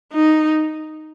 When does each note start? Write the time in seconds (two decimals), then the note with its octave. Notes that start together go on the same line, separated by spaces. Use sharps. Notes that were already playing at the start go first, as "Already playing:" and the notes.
0.13 D#4